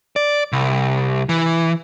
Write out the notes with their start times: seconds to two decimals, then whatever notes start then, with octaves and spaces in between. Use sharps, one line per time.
0.16 D5
0.53 C2
1.29 E3